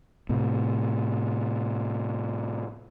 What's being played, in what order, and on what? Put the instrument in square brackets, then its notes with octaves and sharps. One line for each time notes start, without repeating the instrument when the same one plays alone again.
[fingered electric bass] A2 C3